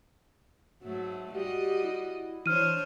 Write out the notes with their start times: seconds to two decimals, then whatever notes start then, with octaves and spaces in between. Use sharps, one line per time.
0.82 G#2 F#3 A3
1.35 G3 F#4 G4 D#5
1.84 E4
2.46 E3 D4 C5 C#5 F6 D#7